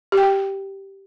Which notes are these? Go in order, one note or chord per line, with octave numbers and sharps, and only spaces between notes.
G4
G5
G4